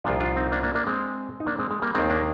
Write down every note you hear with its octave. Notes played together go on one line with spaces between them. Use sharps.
C2 A#2 F3 D4 F4
D4 F4
C4 D#4
A#3 D4
A#3 D4
A#3 D4
G#3 C4
D#4
A#3 D4
G#3 C4
G#3
G3 A#3
D#2 D#3 G#3 C4
A#3 D4